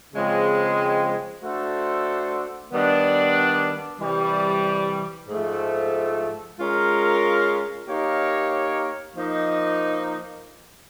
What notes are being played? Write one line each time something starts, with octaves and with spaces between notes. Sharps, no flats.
C#3 F3 G#3 C4
A3 D4 F#4 A4 C5
D#3 G3 B3 D4
C3 E3 G3
G#2 F3 A3
G#3 C#4 F4 A#4
A#3 D#4 G4 A#4 C#5
F3 A#3 D#4